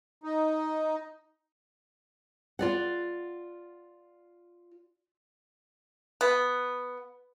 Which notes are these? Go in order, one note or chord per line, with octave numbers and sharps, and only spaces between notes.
D#4
F4 D5 F#5
B3